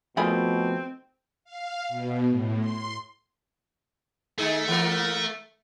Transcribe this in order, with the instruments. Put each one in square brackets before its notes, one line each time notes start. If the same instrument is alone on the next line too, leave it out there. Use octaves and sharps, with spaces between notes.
[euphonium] B2 [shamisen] D#3 G#4 B5 [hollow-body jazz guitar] F3 A3 [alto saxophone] C4
[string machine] F5
B2
A2
C6
[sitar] D#3 D#4 G#4 [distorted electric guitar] A3
[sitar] E3 A#3 A#4